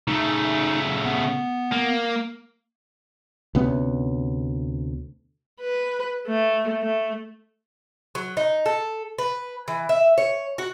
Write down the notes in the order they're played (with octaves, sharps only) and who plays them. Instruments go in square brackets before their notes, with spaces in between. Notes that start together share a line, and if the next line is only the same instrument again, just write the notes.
[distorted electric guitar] C#3 A3 [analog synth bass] D#4
[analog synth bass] B3
[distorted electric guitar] A#3
[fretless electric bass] D2 C3 B3 C#4
[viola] B4
A3
A3
[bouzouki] F#3
D#4
A4
B4
E3
E5
C#5
F#4